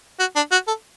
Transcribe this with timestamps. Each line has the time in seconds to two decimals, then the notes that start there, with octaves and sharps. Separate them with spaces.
0.19 F#4
0.36 D4
0.52 F#4
0.68 A4